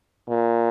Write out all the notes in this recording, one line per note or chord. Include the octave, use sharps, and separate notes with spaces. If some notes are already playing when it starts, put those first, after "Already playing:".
A#2